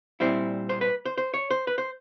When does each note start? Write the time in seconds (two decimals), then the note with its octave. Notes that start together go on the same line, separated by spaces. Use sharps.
0.20 A#2 G3 C4 E4 C5
0.69 C5
0.81 B4
1.05 C5
1.18 C5
1.34 C#5
1.51 C5
1.67 B4
1.78 C5